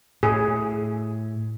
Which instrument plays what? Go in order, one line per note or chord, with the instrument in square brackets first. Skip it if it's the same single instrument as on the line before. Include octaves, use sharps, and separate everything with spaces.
[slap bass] A2 [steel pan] G#4